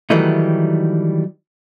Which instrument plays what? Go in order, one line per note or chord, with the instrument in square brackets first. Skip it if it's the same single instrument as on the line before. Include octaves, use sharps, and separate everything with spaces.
[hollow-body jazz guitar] D#3 E3 F#3 G3 A3 D#4